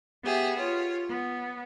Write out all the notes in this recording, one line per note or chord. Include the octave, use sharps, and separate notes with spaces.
B3 G4 G#4 E5
F4 C#5
B3